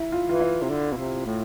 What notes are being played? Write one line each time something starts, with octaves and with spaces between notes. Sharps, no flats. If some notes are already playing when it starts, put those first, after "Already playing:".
Already playing: E4
F4
E3 F4
E4
C3
D3
B2
C3
A2